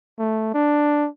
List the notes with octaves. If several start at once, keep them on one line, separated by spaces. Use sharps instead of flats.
A3
D4